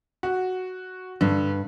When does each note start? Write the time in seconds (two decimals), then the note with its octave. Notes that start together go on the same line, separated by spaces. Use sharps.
0.23 F#4
1.21 G2 D3